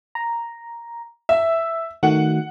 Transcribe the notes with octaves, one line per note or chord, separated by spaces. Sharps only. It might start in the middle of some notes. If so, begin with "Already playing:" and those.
A#5
E5 E6
D#3 A3 F#4 F#5